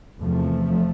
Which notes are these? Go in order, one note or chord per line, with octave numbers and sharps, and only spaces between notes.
E2 C3 F3 A3